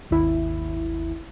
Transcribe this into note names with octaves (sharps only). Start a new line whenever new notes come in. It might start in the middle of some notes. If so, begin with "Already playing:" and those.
G#1 D#2 E4